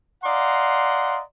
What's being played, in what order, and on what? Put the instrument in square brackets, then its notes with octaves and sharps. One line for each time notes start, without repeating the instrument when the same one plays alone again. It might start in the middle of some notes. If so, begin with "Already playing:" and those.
[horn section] D5 D#5 F5 F#5 A#5 C6